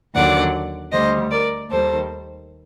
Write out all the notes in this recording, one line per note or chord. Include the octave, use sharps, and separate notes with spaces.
D#2 D3 F#3 D5 F#5
D2 D3 G3 C5 D#5
A#4 D5
D#2 D#3 G3 A4 C5